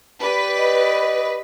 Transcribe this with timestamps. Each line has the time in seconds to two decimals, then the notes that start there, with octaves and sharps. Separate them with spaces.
0.22 G4 B4 D5
0.57 D#5